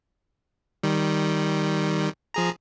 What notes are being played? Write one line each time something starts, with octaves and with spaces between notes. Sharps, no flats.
D#3 G3
F3 G#4 A#5